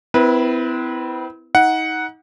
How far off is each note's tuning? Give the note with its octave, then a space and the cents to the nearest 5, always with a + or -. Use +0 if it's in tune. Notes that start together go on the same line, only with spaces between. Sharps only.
C4 -40 E4 +0 B4 -25
D#4 +35 F#5 +0